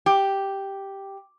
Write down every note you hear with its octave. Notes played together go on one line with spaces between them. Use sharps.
G4